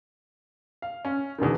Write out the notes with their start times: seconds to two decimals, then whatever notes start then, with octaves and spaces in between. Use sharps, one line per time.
0.82 F5
1.05 C#4
1.38 E2 B2 D3 D#3